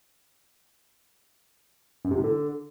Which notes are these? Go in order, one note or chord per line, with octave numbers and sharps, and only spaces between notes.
F#2
C3
A2
D3